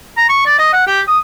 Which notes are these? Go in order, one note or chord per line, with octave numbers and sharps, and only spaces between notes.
A#5
C#6
D5
D#5
F#5
G4
D#6